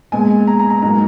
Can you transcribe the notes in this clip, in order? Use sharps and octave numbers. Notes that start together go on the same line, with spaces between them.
A#2 G#3 B3 G#5
A#5
A#5
A#5
G#2 F#3 A#3 A#5